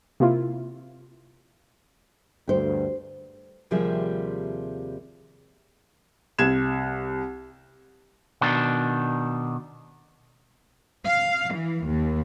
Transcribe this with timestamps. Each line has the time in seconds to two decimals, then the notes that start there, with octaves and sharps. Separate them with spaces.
0.20 C3 A#3 E4 F4
2.48 D2 G2 G4 C5
3.71 D#2 C3 F3 G3 G#4 E5
6.39 C2 G#6 E7
8.41 B2 D#3 D4
11.05 F5
11.55 E3
11.86 D#2